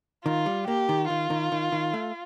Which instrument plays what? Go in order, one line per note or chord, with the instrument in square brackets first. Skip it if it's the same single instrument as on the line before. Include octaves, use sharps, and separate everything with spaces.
[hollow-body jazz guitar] D#3 [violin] F4
[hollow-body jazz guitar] G3
[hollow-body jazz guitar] A#3 [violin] G4
[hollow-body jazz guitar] D#3
[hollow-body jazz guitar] D#3 [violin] F4
[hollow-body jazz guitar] D#3
D#3
D#3
A3